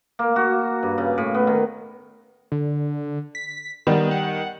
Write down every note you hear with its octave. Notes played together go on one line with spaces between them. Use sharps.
A#3
F#4
G2
C#3
A2
B3
D#3
D3
B6
D#3 G3 B3
F#5